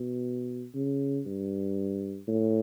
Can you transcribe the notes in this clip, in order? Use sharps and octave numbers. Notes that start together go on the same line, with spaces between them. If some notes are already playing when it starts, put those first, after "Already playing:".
Already playing: B2
C#3
G2
A2